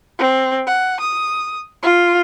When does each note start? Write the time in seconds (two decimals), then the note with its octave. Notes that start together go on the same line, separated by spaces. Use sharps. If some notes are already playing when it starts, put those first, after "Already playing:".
0.19 C4
0.67 F#5
1.00 D#6
1.83 F4